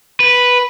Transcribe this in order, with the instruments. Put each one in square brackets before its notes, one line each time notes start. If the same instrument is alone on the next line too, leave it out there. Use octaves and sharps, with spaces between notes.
[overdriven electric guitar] B4